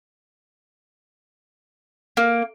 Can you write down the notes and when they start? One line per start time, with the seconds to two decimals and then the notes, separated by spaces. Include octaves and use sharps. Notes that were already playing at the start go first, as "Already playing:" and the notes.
2.17 A#3